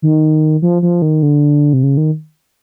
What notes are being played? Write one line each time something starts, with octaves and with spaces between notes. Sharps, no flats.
D#3
F3
F3
D#3
D3
C3
C#3
D#3